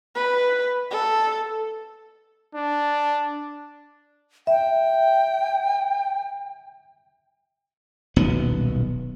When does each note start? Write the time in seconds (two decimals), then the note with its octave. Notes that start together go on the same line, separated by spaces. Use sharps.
0.15 B4
0.91 A4
2.55 D4
4.47 E5 G5
8.16 D#1 B1 B3